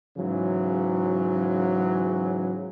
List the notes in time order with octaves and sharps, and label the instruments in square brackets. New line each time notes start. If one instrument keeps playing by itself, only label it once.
[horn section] G#2 C#3 E3 F#3